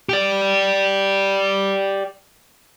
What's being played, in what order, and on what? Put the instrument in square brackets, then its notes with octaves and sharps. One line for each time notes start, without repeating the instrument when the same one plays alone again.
[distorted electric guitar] G4 D5